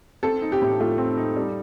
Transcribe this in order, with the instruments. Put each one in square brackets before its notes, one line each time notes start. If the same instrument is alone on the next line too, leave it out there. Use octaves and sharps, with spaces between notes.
[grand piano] C4 [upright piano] A4
[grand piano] D#4
[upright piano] G4
[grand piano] A2
[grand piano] A3 [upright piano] F4
[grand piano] C4
D#4
G3